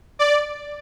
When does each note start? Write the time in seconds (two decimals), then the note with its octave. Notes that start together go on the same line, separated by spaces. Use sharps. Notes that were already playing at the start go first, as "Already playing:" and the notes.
0.19 D5